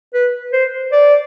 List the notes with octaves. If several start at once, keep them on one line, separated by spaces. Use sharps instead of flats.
B4
C5
D5